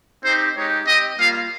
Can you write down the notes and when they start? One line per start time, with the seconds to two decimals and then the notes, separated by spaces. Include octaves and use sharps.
0.23 C4 D#4 G4 C5
0.55 G#3 D#4 G4 C#5
0.86 C4 G4 D#5
1.18 G3 A#3 F4 F5